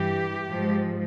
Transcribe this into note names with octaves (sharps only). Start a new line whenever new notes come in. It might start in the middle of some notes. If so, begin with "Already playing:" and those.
Already playing: G2 E3 G4
G#2 F3